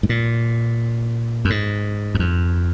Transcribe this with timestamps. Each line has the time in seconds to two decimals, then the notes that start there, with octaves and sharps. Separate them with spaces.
0.03 G#2
0.09 A#2
1.45 F#2
1.50 G#2
2.15 F#2
2.19 F2